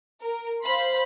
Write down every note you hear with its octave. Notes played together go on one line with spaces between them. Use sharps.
A#4
C5 F5 B5 C6